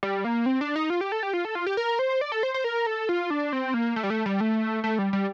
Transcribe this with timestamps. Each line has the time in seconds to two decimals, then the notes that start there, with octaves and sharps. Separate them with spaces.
0.03 G3
0.25 A#3
0.46 C4
0.61 D4
0.76 D#4
0.90 F4
1.01 G4
1.12 A4
1.23 G4
1.34 F4
1.45 A4
1.55 F4
1.66 G4
1.77 A#4
1.99 C5
2.21 D5
2.32 A4
2.43 C5
2.54 C5
2.64 A#4
2.86 A4
3.09 F4
3.30 D4
3.53 C4
3.74 A#3
3.96 A3
4.03 G3
4.10 A3
4.26 G3
4.40 A3
4.84 A3
4.99 G3
5.13 G3